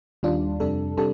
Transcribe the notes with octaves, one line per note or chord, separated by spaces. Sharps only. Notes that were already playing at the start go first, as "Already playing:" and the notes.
D#2 D#3 G3 D4 F4
F2 C3 G3 D4 A4
C3 G3 D4 A4